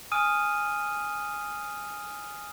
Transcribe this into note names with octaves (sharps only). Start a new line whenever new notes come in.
G#5 D#6 F6 D#7